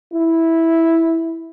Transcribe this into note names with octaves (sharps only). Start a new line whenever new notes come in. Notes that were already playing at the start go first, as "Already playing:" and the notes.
E4